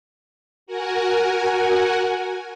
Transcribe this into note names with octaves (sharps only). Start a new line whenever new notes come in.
F#4 A#4 F#5 G#5